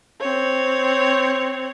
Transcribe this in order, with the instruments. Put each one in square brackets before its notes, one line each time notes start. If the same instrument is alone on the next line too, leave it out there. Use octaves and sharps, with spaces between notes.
[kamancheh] C4 C#5